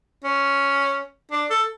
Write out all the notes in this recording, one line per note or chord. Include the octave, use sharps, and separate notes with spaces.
C#4
D4
A4